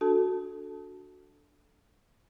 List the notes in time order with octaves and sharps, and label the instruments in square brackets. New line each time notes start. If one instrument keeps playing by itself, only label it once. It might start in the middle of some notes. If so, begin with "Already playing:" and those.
[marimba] D4 F#4 A4 A5